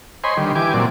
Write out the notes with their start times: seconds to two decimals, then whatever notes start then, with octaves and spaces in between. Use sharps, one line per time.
0.24 C5 C#5 D#5 G#5 B5 C6
0.37 D3 D#3 G3
0.55 E3 G4 G#5 D6
0.74 A#2 F#3 C4 D5